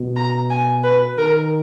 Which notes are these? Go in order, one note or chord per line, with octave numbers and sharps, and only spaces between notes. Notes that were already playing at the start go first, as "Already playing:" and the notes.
Already playing: B2
A#5
G#5
B4
D#3 A#4